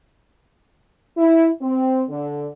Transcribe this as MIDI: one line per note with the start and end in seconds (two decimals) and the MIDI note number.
1.17 1.49 64
1.62 2.04 60
2.10 2.47 50